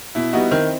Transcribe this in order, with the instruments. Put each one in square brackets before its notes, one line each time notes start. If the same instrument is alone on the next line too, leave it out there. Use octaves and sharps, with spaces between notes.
[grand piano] B2 [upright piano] E4
[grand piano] G3 B3 F#4 [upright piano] D#4
[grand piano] D#3 [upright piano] C4